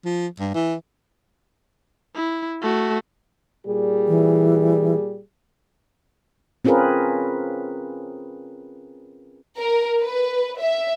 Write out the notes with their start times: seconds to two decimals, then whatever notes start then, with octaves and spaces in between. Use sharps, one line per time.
0.05 F3
0.40 G2
0.54 E3
2.15 E4
2.62 A3 F#4
3.66 A#2 G3 G#4
4.08 E3
6.65 C4 C#4 F4 G#4 A#4 B4
9.58 A#4
10.03 B4
10.61 E5